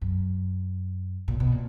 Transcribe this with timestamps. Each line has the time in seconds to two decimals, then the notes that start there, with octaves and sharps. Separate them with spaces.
0.01 F#2
1.28 A#2
1.40 B2
1.52 A#2